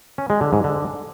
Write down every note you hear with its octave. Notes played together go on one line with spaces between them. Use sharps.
C#4
G#3
D3
G#2
D3